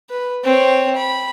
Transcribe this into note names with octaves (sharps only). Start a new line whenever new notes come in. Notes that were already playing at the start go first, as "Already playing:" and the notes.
B4
C4 C#5
B5